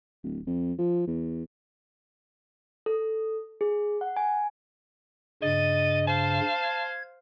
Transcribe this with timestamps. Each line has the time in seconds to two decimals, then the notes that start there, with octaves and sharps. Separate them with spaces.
0.24 D1
0.47 F2
0.79 F3
1.07 E2
2.86 A4
3.61 G#4
4.01 F#5
4.17 G#5
5.43 G2 C#3 D#5 A6 D#7
6.07 C5 F5 A5
6.62 G#6